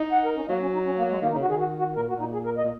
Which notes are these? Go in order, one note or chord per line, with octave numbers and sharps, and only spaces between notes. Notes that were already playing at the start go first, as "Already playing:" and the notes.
Already playing: D#4
F#5
A#4
C#4
F#3 A#3
C#4
D#4
C#4
A#3
G#3
D#3 A#3
D#4
C#3
F#4
D#3 G#4
F#4
F#4
A#2 A#4
F#4
A#2 D#4
G#4
A#4
D#5
A#2